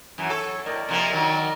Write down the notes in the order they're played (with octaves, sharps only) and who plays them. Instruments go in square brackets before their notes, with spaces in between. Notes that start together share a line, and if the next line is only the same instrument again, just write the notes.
[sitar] F#2 E3
[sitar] A4 [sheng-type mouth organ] C#5 C#6
[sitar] A2 [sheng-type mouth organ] A#4 D5 D#5
[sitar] C3 F3 A#3
D#3 F#3